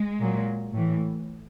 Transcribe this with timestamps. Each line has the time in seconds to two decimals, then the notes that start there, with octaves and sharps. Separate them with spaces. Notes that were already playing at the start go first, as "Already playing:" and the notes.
Already playing: G#3
0.20 A#2 F#3
0.73 A2 E3